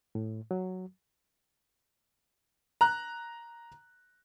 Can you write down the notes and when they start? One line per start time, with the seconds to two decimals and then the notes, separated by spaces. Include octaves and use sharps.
0.15 A2
0.51 F#3
2.81 A#5 F#6